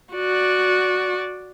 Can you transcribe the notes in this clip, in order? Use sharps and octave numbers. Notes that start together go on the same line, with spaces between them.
F#4 D5